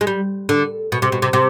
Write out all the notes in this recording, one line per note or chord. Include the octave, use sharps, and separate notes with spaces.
G#3
G3
D3
B2
C3
B2
C3
C3